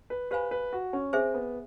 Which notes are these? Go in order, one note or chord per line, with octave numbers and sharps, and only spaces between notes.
B4
G4 B4 C5 F5 G#5 B5
B4
F#4
C#4
C4 G#4 C5 E5 G#5
B3